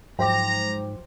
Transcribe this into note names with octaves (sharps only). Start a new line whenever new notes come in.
G#2 F3 F#3 C5 G5 A#5 D6